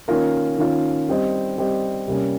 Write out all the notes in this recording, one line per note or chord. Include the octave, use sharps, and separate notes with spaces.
D#3 A#3 C#4 F4 A#4
D#3 A#3 C#4 F4 A#4
G3 C4 G4 C5 D#5
G3 C4 G4 C5 D#5
C3 G3 A#3 C#4